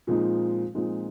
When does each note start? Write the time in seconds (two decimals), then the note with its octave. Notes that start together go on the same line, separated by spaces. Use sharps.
0.07 A#2 F3 G#3 C4 D#4
0.75 A#2 F3 G#3 C4 D#4